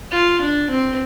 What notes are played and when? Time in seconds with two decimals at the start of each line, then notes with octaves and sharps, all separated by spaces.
0.11 F4
0.41 D4
0.70 C4